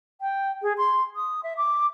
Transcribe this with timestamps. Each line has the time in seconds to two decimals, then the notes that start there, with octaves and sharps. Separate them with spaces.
0.21 G5
0.62 G#4
0.77 C6
1.16 D#6
1.43 E5
1.57 D6